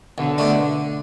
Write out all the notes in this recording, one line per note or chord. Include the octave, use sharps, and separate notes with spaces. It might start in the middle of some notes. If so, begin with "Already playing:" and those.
B1 D3
B2 A3 D4